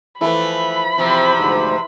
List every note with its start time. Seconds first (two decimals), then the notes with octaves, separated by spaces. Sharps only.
0.21 E3 F3 A3 E4 B4 B5
0.98 E2 C3 F3 C4
1.37 D2 G#2